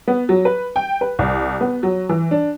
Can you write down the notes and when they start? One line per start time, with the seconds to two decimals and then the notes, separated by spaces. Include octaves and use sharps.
0.08 B3
0.29 F#3
0.45 B4
0.76 G5
1.01 B4
1.19 C2
1.61 B3
1.83 F#3
2.09 E3
2.31 D4